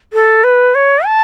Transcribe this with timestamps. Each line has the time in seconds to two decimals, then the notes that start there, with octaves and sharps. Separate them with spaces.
0.13 A4
0.44 B4
0.75 C#5
1.06 A5